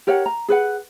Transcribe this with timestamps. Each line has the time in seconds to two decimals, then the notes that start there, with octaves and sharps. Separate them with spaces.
0.07 G4 A#4 C#5 F#5
0.26 A#5
0.48 G#4 B4 F#5